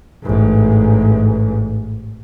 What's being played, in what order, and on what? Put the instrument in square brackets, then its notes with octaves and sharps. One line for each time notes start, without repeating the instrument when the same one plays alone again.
[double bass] A1 G#2